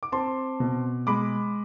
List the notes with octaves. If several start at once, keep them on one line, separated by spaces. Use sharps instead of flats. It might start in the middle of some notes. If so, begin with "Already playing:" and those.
D6
C4 A5 C6
B2
G#3 B5 D6